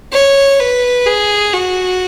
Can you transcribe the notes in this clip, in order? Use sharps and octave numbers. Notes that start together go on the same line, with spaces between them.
C#5
B4
G#4
F#4